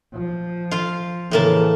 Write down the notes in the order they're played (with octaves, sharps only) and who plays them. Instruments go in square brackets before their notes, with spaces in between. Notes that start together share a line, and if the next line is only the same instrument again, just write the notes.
[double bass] F3
[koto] F4 F5
[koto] A2 A#3 A5 [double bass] C#3 E3